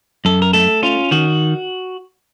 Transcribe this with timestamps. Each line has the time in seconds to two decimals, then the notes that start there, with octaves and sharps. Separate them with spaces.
0.25 F#2 A4
0.42 A#4
0.53 A3 A4
0.83 C#4 F4
1.11 D#3 F#4